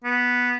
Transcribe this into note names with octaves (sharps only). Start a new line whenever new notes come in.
B3